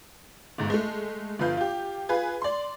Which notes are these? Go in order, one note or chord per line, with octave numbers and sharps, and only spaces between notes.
G1 G#2
G#3 A3
G1 F3 B4 F5 G6
F4 G4
F4 G#4 B4
D5 C6